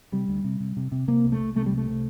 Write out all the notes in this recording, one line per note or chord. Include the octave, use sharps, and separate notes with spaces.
C3 G3
D2
C3
C3
C3
C3
C3 A#3
C2
A3
C2
C3 A3
G3
C2
A3
C3